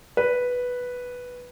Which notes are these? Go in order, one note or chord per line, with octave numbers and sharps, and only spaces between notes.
B4